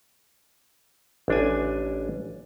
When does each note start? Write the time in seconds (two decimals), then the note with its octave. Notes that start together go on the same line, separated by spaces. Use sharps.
1.28 A1 D4 G#5